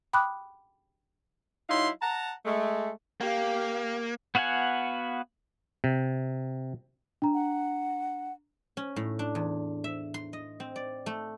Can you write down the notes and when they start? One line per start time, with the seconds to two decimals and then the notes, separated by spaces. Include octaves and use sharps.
0.13 G5 B5 D6 D#6 F#6
1.69 F#3 D#4 E4 F5 C6
2.01 F#5 A5 A#5
2.46 G#3 A3
3.21 A#3 G4 F5
4.35 B3 F#4 F5 F#5 G#5
5.84 C3
7.22 D4 A#5
7.34 F#5
8.77 C#4
8.96 A2
9.19 D4
9.35 E2
9.84 E5
10.14 C6
10.33 D#5
10.60 C4
10.76 D5
11.06 A3